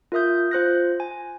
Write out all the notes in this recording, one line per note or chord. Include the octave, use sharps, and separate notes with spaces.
F4 A#4 E5 D#6 G6
F4 C5 F#6 A#6
G#5